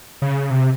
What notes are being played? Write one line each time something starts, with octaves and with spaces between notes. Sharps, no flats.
C#3
C3